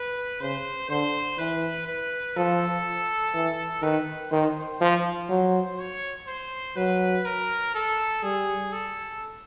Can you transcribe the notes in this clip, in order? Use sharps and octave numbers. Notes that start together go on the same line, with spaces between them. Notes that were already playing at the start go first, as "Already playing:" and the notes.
Already playing: B4
C#3 C5
D3 C5
E3 B4
B4
F3 A4
E3
D#3 B4
D#3 C5
F3
F#3
C#5
C5
F#3 B4
A#4
A4
G3 G#4
A4